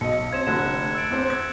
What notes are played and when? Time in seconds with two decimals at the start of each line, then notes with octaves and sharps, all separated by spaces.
0.01 B1 D#5 C#7
0.32 C4 C#4 G#6 E7
0.47 F1 D3 F#6 E7
0.95 E6 A6 D7
1.10 E2 C4 C5
1.30 G#6